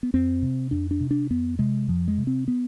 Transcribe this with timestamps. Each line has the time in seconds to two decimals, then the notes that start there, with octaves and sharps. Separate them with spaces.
0.03 B3
0.14 F2 C4
0.43 C3
0.71 F2 D4
0.91 D4
1.00 C3
1.11 D4
1.30 F2 B3
1.59 C3 G#3
1.88 F2 F3
2.08 G#3
2.18 C3
2.27 C4
2.48 B3